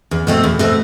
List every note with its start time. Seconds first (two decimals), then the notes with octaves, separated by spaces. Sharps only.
0.11 E2
0.27 B2 A3 C4
0.44 E2
0.59 B2 A3 C4